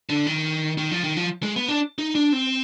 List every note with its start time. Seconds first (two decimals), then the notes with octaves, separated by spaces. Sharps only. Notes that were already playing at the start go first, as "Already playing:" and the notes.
0.10 D3
0.27 D#3
0.78 D#3
0.92 F3
1.04 D#3
1.17 F3
1.43 G#3
1.56 B3
1.68 D4
1.98 D#4
2.15 D4
2.33 C4